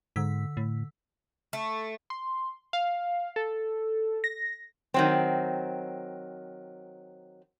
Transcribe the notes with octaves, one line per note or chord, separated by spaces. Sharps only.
G#2 D3 E6 B6
A2
A3
C6
F5
A4
A#6
D#3 F#3 C4